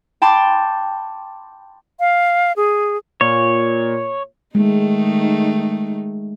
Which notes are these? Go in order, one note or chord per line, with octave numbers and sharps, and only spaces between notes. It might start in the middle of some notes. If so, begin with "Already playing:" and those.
G5 A5 B5 C6 D6 A6
F5
G#4
A#2 C#5
D#3 G#3 A3 D#4